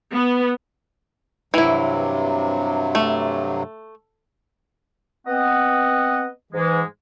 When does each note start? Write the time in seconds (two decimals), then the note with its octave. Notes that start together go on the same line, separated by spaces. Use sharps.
0.14 B3
1.54 G2 C3 E3 F#3 E4
2.95 A3
5.27 B3 C4 D#5 F#5
6.53 G#2 E3 G#3